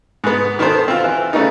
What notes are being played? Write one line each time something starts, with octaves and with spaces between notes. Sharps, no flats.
G#2 B3
D#3 B3 A4 C5
C4 F4
E3
C#3 A3 B3 D#4